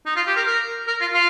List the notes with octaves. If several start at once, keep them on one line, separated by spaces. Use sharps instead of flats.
D#4
F4
G4
A#4
A#4
A#4
F4
F4